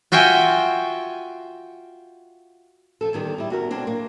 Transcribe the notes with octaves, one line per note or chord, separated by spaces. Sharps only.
F4 F#4 E5 G5 G#5
F3 A4
E2 D#3 G3
G3 E4
B2 F#4 A#4
F#3 C4 D4
A#3